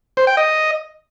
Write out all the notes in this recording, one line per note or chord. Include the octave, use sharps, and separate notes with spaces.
C5
G5
D#5